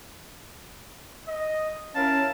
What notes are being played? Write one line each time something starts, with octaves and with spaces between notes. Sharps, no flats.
D#5
C#4 E4 A#4 F5 A5